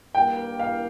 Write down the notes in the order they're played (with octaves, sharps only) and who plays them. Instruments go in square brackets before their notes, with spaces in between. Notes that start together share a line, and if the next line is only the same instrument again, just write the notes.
[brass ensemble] G2 G3 A#3 [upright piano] G5
[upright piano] F5